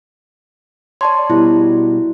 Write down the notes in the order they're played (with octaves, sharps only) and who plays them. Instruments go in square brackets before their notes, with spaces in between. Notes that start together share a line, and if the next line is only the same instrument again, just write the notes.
[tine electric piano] C#5 [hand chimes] D5 A5 C6
[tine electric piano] B2 G3 [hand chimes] E4